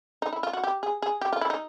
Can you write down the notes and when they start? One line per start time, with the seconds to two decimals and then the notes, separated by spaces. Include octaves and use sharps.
0.22 D#4
0.33 E4
0.43 F4
0.53 F#4
0.64 G4
0.83 G#4
1.02 G#4
1.21 G4
1.33 F4
1.41 E4
1.50 D#4